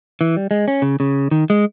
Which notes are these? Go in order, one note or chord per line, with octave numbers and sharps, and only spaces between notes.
E3
G3
G#3
C#4
C#3
C#3
D#3
G#3